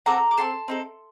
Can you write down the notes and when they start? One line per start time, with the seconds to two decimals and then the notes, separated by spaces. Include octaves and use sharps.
0.06 C4 F#4 A4 A#5 D6
0.31 D6
0.37 C4 F#4 A4 A5 C6
0.68 C4 D#4 A4